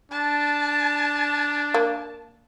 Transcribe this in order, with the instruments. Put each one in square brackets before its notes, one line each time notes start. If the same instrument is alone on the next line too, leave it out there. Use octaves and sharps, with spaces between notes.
[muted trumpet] D4 [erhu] A5
[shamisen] A#3